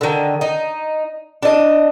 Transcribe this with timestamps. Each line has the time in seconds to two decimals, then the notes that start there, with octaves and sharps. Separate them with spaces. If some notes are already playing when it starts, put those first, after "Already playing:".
0.01 D3 D#3
0.41 D#4
1.43 D4 D#5